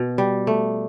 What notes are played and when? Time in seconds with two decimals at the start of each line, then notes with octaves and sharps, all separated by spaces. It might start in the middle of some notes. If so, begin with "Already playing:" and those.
Already playing: B2
0.18 G3
0.47 A3